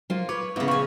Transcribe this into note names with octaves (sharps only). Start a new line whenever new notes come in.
F3 F#3 A#3 F4 C6
B4 C#5 D6
A#2 C#3 B3 E4 F4
F3 F5 G#5 C#6